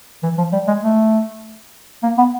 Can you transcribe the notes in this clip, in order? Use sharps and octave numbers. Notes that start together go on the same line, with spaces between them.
E3
F3
G3
G#3
A3
A#3
B3